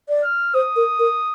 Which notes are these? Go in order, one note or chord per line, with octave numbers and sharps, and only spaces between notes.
D5
F6
C5 D#6
A#4
A#4